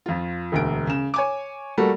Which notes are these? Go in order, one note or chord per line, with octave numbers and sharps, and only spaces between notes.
F2 F4
E1 D2 D7
C#3 E7
C#5 G#5 D6
G3 A3 A#3 F#4 A4